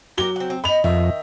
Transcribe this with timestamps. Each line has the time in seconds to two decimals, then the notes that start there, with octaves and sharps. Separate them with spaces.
0.18 F#3 F#4 G4 A#4 G7
0.36 C4 F#5
0.50 C4
0.64 D#5 B5 F7
0.84 F2 D#3 D#5 E5